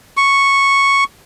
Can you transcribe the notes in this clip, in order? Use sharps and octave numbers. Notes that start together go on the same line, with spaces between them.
C#6